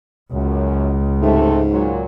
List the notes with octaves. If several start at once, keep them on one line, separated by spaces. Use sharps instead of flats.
C#2 F#2
G#2 C3 A3
A#2 F#3